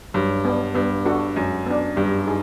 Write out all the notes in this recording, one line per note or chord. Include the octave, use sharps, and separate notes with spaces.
G2 F#3
B3 D4
G2 B3
D4 F#4 A4
F#2 G#3
B3 D4
G2 G3
D#4 G#4